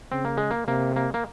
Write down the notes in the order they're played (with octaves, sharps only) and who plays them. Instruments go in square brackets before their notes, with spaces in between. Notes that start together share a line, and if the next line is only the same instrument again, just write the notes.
[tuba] C#3 [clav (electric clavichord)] C4
[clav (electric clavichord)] A#3
G#3
A#3
[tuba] C3 [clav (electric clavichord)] A#3
[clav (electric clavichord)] A#3
A#3